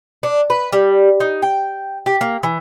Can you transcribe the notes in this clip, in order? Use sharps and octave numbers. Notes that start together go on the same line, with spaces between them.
D4
B4
G3
D#4
G5
G4
A#3
E3